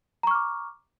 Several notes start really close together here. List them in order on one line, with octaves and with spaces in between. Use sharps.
A#5 C#6 F6 D6